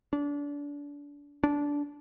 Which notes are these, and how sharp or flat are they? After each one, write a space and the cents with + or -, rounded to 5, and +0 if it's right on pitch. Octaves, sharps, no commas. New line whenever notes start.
D4 -30
D4 -15